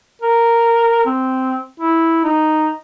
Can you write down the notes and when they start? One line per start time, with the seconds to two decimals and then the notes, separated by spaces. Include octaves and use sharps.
0.22 A#4
1.06 C4
1.80 E4
2.24 D#4